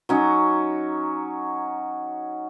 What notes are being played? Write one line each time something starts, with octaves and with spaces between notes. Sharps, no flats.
F#3 C#4 D#4